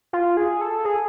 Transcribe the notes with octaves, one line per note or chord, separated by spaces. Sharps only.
F4
G#4
A4
G#4